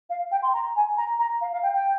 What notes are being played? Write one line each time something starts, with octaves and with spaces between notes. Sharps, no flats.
F5
G5
C6
A#5
G#5
A#5
A#5
F5
F5
G5
G5